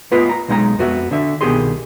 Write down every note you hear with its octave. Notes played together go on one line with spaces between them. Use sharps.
A3 B3 F4 B4 D#5
A#5
B1 G#3 D#4 G5 A#5
F2 B3 F#4 E5
D3 E5
C2 B2 D#3 G4 G#4 C6